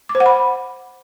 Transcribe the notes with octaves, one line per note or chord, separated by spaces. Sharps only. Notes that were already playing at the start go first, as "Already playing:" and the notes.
D6
C5
F#5
B5